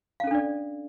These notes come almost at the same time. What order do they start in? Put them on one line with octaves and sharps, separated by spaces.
F5 C#4 A4 D4 D5